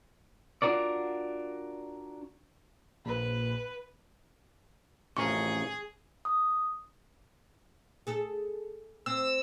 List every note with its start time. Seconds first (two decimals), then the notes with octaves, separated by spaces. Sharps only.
0.62 D4 F4 F#4 A#4 D5
3.06 A#1 B4
5.17 A1 F2 G#4 A#4 C#6
6.25 D#6
8.07 G#4 A4
9.06 C4 E6